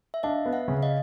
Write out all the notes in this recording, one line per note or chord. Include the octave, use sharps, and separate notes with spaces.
E5
D4 D#5 F5
B3
E5 F#5
C#3
D#5 F5